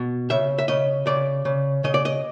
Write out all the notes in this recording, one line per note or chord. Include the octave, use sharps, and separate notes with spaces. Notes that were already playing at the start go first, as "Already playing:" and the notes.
Already playing: B2
C#3 E5
E5
C#3 D#5
C#3 D5
C#3
C#3 D#5
D5
D#5